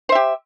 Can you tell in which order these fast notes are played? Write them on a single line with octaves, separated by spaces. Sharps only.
C5 E5 G4